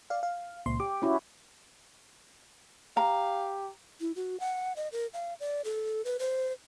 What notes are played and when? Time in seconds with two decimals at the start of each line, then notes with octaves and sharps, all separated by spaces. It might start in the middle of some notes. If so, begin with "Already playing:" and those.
0.10 D5 F5
0.23 F5
0.66 C#2 A#2 C6
0.80 G4 D6
1.02 C#4 E4 F#4
2.97 G4 F5 A#5
4.01 E4
4.16 F#4
4.40 F#5
4.76 D#5
4.92 A#4
5.13 F5
5.40 D5
5.65 A4
6.05 B4
6.19 C5